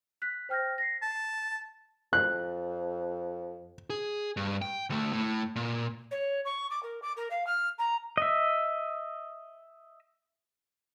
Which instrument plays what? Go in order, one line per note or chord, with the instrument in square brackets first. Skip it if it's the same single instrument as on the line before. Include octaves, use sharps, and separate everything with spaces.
[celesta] F#6 B6
C5 G5 F6 G6 A#6
A#6 C7
[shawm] A5
[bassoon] F2 [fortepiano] F#6
[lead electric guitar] G#4
G2
G5
D2 A3
A2
A#2
[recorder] C#5
C#6
D6
A#4
D6
A#4
F5
F6
A#5
[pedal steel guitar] D#5 E5